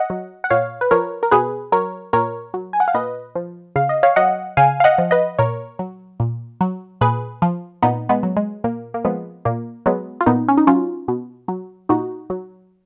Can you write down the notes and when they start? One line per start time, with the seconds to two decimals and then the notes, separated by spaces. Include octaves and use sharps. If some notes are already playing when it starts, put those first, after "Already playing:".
Already playing: D#5 F#5
0.10 F#3
0.44 F#5
0.50 A#2 C#5 F5
0.81 B4
0.91 F3 A#4 C#5
1.23 A#4
1.31 B2 G#4 B4
1.72 F#3 A#4 C#5
2.13 A#2 A#4 C#5
2.54 F#3
2.73 G#5
2.80 F#5
2.88 F5
2.95 A#2 B4 D#5
3.35 F3
3.76 C#3 F5
3.89 D#5
4.03 C#5 F5
4.16 F#3 D#5 F#5
4.57 C#3 F5 G#5
4.80 F5
4.84 D#5 F#5
4.98 F3
5.11 B4 D#5
5.39 A#2 A#4 C#5
5.79 F#3
6.20 A#2
6.61 F#3
7.01 A#2 G#4 B4
7.42 F3
7.83 A#2 B3 D#4
8.09 G#3 B3
8.23 F#3
8.37 G#3
8.64 A#2 A#3
8.94 A#3
9.04 F3 G#3 B3
9.45 A#2 A#3
9.86 F#3 G#3 B3
10.21 F4
10.26 A#2 B3 D#4
10.48 C#4
10.57 D#4
10.67 F#3 C#4 F4
11.08 B2
11.48 F#3
11.89 A#2 D#4 F#4
12.30 F#3